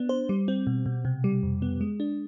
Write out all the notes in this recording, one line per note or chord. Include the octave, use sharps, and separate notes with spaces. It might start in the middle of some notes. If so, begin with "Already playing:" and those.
Already playing: B3 D4
C5
G3
C4
B2
B2
C3
G3
F2
B3
G#3
D4